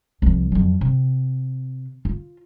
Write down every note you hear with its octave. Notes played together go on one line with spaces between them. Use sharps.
C2 F3
F2 F#3
C3
F4